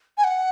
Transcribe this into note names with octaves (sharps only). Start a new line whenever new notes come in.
G#5
F#5